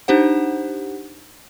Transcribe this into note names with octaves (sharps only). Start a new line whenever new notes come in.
D4 D#4 G4 C5 F#5